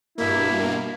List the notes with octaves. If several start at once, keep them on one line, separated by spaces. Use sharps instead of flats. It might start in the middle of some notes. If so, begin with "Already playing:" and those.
G2 B2 A#3 E4